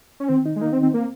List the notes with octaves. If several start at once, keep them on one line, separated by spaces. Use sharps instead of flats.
C#4
D#3 C4
D#4
G#3
A#3 D#4
C4
D#3
C4
A#3 C4